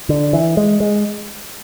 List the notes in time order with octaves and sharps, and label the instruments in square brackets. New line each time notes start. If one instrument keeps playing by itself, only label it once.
[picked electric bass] D3
E3
G#3
G#3